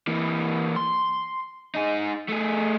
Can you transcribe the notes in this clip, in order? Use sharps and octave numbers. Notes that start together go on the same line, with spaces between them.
E3 A#3
C6
D#4 G#4
A3 G#4